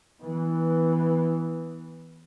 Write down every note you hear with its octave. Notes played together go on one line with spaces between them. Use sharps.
E3 B3